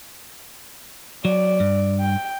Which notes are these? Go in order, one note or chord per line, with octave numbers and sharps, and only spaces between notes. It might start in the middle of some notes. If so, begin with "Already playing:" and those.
F#3 D5
G2
G5